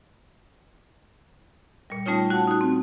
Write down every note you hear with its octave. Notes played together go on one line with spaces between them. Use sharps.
A#2 G3
G3 A3 C#4 D#4 F4 C#5
F#4 F#5 A5
D#4 F#4
C4